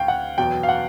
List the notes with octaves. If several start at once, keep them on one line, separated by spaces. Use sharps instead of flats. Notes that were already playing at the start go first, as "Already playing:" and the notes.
Already playing: D2 F5 G5
F#5
E2 B2 F#3 G5
F5
F#5